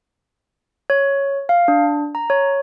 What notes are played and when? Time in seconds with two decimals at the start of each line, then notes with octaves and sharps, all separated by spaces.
0.90 C#5
1.49 F5
1.68 D4
2.15 A#5
2.30 C#5